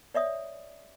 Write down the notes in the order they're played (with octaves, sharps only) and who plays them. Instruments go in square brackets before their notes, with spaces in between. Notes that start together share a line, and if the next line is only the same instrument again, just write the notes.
[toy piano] C#5 D5 E5 D#6